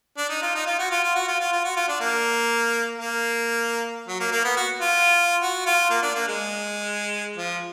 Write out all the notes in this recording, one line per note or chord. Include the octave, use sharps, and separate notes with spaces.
D4
D#4
F4
D#4
F4
F#4
F4
F4
F#4
F4
F4
F4
F#4
F4
D4
A#3
A#3
F#3
A#3
A#3
B3
F#4
F4
F#4
F4
A#3
D4
A#3
G#3
F3